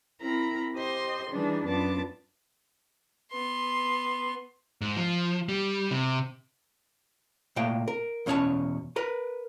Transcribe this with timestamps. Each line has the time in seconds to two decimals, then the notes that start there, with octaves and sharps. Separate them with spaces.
0.20 C4 E4 A#4 A#5 B5
0.74 G4 C5 D#5 C6
1.29 E3 G3 D4 D#4 G#4
1.65 F#2 B3 D4 F4 A5 D6
3.32 B3 C6
4.81 G#2
4.97 F3
5.49 G3
5.91 C3
7.56 A#2 A3 A#3 G5
7.88 A#4
8.26 E2 B2 C#4 D#4 C#5 A5
8.96 A#4 B4 A#5